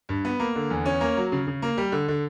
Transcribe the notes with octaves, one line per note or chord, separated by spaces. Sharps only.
G2
B3
A#3
D3
E2
C#4
A#3
F#3
C#3
C#3
A#3
G3
D3
D3